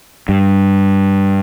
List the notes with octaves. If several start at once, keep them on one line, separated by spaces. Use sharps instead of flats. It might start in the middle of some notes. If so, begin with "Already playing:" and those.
G2